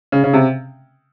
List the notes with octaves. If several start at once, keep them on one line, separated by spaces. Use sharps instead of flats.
C#3
C#3
C3